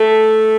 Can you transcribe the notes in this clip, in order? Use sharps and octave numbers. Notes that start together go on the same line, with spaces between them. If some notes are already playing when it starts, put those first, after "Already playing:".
Already playing: A3